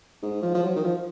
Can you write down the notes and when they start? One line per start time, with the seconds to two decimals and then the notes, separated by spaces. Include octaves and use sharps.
0.23 G#2
0.43 F3
0.55 F3
0.63 F#3
0.76 D#3
0.84 F3